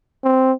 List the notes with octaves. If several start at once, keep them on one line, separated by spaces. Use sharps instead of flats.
C4